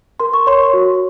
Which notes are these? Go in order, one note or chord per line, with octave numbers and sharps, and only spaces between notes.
A#4 C6
C#6
C#5 C6
F#4